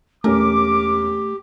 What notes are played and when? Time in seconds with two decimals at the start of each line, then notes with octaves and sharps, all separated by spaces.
0.24 E1 A3 C#4 G4 A#4 D6